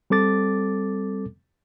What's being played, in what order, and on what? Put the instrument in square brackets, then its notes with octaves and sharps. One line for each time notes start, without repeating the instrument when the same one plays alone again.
[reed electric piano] G3 C4 A4 D6 A6